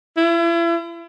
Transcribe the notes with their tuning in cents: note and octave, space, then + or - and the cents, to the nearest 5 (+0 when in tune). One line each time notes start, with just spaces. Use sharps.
E4 +40